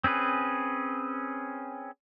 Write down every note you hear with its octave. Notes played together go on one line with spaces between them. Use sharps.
C4 C#4 G#4 B4